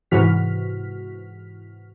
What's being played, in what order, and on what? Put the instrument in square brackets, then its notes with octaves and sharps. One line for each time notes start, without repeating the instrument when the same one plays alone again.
[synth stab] G#2 C3 E3 F#4 F6 B6